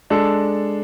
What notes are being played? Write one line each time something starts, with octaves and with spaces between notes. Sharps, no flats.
G#3 D4 A4